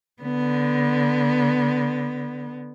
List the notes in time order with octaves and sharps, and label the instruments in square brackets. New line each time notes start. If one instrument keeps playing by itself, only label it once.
[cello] D3 B3